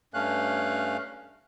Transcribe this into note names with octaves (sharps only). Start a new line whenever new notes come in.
G2 A3 C#4 F5 F#6